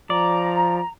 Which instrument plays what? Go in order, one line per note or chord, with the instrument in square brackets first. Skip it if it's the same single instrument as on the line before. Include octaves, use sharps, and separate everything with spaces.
[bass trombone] F3 [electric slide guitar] D5 [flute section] A#5